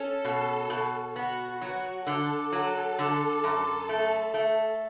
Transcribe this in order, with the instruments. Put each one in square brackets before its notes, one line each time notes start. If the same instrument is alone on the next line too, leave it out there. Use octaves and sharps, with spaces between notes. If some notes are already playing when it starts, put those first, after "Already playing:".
Already playing: [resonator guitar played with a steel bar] C#4 [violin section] A4
[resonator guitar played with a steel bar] B2
B2
[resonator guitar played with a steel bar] B3 [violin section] F#4
[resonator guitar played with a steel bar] F#3 [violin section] F#4
[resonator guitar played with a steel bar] D3 [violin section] A4
[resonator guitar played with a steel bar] F#3
D3
F#2
A3
A3